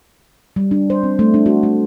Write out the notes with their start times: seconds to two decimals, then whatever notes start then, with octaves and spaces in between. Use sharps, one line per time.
0.56 G3
0.71 D4
0.90 C5
1.03 C4
1.19 A3
1.34 D4
1.46 F#4
1.63 A3